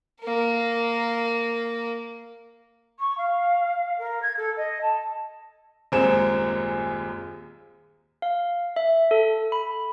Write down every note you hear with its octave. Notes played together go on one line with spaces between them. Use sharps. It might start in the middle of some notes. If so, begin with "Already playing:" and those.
A#3 A#4
C#6
F5
A#4
G#6
A4
D#5
A5
D#1 F#2 G#3 C4 G#5 E7
F5
E5
A4
B5